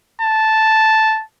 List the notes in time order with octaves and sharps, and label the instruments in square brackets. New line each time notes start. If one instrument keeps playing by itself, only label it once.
[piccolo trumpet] A5